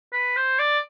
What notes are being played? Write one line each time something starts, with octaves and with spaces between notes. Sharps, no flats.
B4
C5
D5